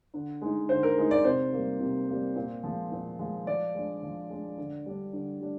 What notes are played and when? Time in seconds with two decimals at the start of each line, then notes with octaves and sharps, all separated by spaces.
0.14 D3
0.41 G#3 D#4
0.69 D3 C5
0.83 A#4
0.98 G#3 D#4
1.11 D5
1.25 C3 C5
1.53 G3 A#3
1.80 C3
2.09 G3 A#3
2.36 A#2
2.63 F3 G#3
2.92 A#2
3.19 F3 G#3
3.47 F3 D5
3.75 G#3 D4
4.03 F3
4.30 G#3 D4
4.58 D3
4.86 G3 D4
5.13 D3
5.41 G3 D4